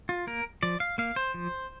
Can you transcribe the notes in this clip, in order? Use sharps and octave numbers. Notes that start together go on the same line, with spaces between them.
F4
A#3 A#4
F3 D5
F5
A#3 F5
C5
F3